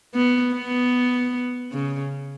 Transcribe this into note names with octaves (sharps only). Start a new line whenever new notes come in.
B3
B3
C#3